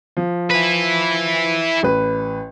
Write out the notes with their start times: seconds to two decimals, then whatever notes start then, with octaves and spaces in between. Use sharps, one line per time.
0.17 F3
0.51 E4 B4
1.83 A1 B4